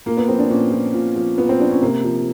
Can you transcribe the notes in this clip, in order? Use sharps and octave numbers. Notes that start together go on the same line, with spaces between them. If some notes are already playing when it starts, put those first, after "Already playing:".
A#2 A#3
B3
F3 C4
D4
A#2 C#4
F3
A#2
F3
A#2 B3
C4
F3 D4
C#4
C3 A#3
F3